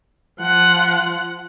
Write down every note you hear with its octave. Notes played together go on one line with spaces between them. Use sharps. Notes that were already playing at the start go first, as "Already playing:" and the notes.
F3 F#5